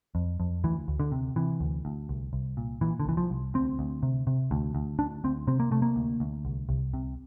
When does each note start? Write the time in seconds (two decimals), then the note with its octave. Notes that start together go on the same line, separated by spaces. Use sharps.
0.15 F2
0.40 F2
0.64 D2 E3
0.88 D2
1.00 D3
1.12 C3
1.36 C3 E3
1.60 D2
1.85 D2
2.09 C2
2.33 C2
2.57 A#2
2.81 A#2 E3
3.00 D3
3.05 C2 E3
3.17 F3
3.30 C2
3.54 D2 C4
3.79 D2
4.03 C3
4.27 C3
4.51 D2
4.75 D2
4.99 D2 D4
5.24 D2 C4
5.47 C3 C4
5.60 A#3
5.71 C3 A3
5.82 A#3
5.96 D2
6.20 D2
6.45 C2
6.69 C2
6.94 C3